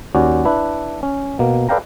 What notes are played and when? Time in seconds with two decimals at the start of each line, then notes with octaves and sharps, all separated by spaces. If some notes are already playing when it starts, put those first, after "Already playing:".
0.15 D#2 C#4 F#4 D5
0.45 D4 E4 B4
1.03 C#4
1.39 B2 A#3
1.69 A4 B4 D5 F5 G5 A#5